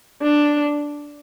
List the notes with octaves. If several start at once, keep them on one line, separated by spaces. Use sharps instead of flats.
D4